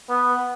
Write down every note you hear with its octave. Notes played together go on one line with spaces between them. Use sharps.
B3